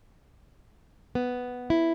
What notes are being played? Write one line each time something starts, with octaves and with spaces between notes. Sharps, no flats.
B3
E4